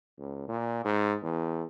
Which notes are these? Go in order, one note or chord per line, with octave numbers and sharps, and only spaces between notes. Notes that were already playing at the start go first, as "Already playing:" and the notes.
C#2
A#2
G#2
E2